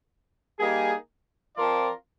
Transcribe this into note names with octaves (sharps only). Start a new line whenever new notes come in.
G3 A#3 D#4 G#4
F3 C4 F4 A#4 D5